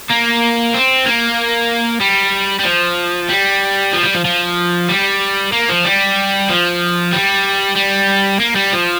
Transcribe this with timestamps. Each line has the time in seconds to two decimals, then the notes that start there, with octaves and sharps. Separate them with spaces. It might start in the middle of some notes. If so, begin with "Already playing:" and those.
0.10 A#3
0.74 C4
1.06 A#3
2.01 G3
2.60 G3
2.65 F3
3.29 G3
3.93 F3
4.03 G3
4.15 F3
4.25 F3
4.89 G3
5.53 A#3
5.69 F3
5.85 G3
6.49 F3
7.13 G3
7.76 G3
8.40 A#3
8.55 G3
8.73 F3